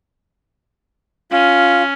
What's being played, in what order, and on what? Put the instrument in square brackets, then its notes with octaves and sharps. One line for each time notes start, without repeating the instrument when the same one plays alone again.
[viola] C#4 [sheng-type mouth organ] F4